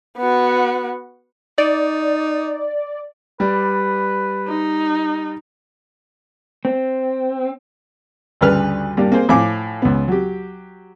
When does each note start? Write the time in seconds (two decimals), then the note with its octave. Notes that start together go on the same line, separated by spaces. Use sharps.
0.18 B3 F#4
1.58 D#4 D5
3.40 G3 B4 D5
4.48 D#4
6.65 C4
8.41 D2 G2 C#3 B4 F6
8.97 G2 A#3 G4 D5
9.12 A#3 C4 G#4 C5 G#5
9.29 A2 F3 F5 G#5 D6
9.82 C#2 B3
10.08 F#3 G4